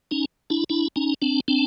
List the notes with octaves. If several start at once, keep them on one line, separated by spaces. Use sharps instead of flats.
C#4 D#4
D4 E4
D4 E4
C#4 D#4
C4 D4
C4 D4